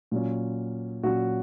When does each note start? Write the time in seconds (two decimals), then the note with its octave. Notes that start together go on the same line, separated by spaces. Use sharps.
0.12 A#2 F#3 C#4
1.03 A#2 F#3 C#4 F#4